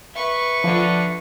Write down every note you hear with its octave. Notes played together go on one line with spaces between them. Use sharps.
B4 E5 C#6
D3 F3